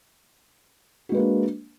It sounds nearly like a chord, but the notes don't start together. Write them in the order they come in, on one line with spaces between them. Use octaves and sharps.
F#4 G#3 B4 A#3 D4